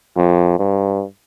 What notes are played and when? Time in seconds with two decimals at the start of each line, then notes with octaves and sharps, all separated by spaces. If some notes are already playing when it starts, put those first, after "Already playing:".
0.16 F2
0.59 G2